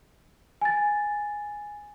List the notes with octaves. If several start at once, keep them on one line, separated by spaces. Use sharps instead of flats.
G#5 A6